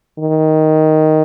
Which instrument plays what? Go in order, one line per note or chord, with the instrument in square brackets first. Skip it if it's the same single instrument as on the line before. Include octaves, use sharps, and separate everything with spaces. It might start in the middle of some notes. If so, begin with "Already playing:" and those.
[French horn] D#3